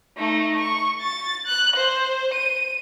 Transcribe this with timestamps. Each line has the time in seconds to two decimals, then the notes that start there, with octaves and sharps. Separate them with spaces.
0.17 A3 D#4
0.60 C#6
1.00 A6
1.46 F#6
1.76 C5
2.33 D#7